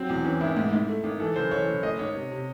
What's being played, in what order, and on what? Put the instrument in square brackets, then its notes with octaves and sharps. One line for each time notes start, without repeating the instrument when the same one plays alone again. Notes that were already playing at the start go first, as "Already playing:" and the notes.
Already playing: [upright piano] F#3 [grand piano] C4
[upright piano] E2
[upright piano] E3 [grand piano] C#4
[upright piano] G#1 [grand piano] E4
[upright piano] G#2
G#2
A3
G#1
[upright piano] E3 [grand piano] A4
[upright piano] F#1 [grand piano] C5
[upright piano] E3 [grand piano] C#5
[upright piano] F#1
[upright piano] A3 [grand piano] D#5
[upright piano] G#1 [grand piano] C#5
[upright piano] C3
C3